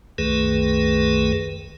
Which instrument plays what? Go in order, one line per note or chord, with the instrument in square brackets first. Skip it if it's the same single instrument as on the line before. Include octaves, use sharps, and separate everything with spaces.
[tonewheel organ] C2 F#2 D#3 A3 G#4 B4